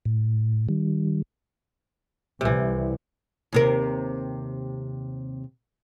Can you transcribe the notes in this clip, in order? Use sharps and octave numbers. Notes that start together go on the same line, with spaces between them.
A2
D#3 G3
C2 C3 E3
D#2 C3 A#4